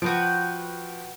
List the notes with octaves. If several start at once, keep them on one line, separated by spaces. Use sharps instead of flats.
F3 F#4 B4 G5